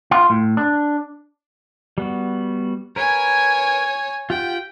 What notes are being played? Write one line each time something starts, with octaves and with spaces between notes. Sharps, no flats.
F4
A2
D4
G3 B3 F#4
A#4 B4 C#5 G#5
F4 G4 F#5 G5